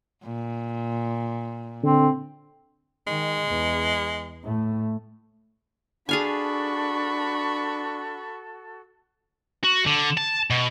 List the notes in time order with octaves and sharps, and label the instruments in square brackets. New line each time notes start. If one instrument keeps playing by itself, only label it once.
[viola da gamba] A#2
[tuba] D3 [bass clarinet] C4
[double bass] D#3 [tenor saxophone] G#3
[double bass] E2
A2 A3
[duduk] D4 [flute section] F#4 A4 [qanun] G#4 F5 G#5 [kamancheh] B5 C#6
[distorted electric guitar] F#4
D3
A5
B2